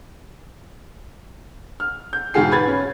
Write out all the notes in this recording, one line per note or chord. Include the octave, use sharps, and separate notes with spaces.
F6
G6
E1 G#2 F4 F#4 G#4 C7
B4 B5 G#6 A6
C#4